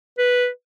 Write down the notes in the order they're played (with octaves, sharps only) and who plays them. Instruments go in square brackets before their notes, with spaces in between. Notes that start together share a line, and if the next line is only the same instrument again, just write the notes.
[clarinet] B4